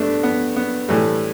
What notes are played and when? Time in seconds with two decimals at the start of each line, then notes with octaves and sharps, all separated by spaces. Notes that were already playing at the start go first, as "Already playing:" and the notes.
Already playing: G2 G3 A3 B3 D4
0.23 B3
0.56 B3
0.89 A2 E3 G3 A3